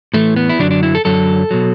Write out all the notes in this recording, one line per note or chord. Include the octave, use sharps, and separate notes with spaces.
A2 E3 A3
B3
E4
F#2 D3 F#3 D4
D4
E4
A4
F#2 D3 F#3 A4
B2 F#3